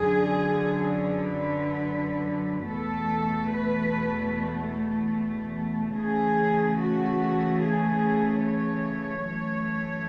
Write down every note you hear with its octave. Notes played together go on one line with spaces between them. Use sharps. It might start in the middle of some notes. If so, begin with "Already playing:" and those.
Already playing: F#2 D3 F#3 G#4
B4
E2 B2 A3 A4
B4
C#3 E3 A3 G#4
F#4
G#4
C#5
F#2 E3 A3